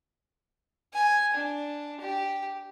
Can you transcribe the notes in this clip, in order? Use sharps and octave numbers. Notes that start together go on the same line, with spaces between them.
G#5
D4
G4